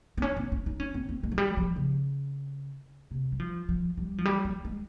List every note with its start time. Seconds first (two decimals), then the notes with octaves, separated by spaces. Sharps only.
0.17 C4
0.22 C#4
0.37 C4
0.52 C#4
0.66 D#4
0.80 C#4
0.94 C4
1.09 C4
1.23 G#3
1.32 F3
1.38 G3
1.57 F3
1.76 C#3
3.11 C3
3.32 G3
3.40 F3
3.69 F3
3.97 G3
4.18 F3
4.25 G3
4.45 F3
4.65 G#3